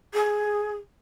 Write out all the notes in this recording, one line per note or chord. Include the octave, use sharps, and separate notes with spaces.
G#4